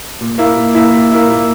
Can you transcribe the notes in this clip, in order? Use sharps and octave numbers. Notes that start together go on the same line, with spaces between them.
A#2
A#3 E4
A#2
A#3 E4
A#2
A#3 E4
A#2